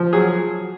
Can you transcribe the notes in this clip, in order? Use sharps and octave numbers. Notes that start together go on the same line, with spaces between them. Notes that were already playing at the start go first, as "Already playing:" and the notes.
Already playing: F3
F#3 G#4